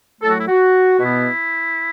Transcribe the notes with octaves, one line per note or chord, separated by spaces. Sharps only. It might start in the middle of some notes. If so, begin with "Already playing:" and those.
A2 F#3 A3 A4
F#4
E4
F#4
B2 B3 E4